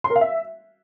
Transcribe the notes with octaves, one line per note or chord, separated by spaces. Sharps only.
C6
A#4
F5
E5